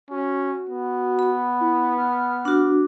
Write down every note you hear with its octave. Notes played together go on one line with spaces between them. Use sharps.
C#4 F#4
B3
B5
E4
F6
D4 F#4